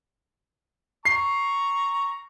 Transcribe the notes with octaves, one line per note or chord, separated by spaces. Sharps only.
A#5 C#6 C7